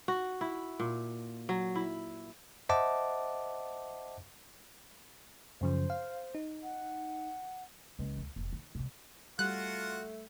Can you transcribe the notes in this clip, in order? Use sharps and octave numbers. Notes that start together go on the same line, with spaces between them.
F#4
E4
A#2
F#3
E4
C5 D#5 E5 F#5 A5 D6
F#2 C#3 F3 C5
F5
D#4
F#5
C#2 E3
D2
F1 F2
D#3
G2 C3
G3 A3 F4 F#4 F#5 F#6